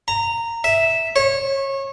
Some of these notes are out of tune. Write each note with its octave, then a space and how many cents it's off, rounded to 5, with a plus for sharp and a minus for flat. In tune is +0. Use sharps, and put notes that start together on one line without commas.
A#5 -15
E5 -5
C#5 -25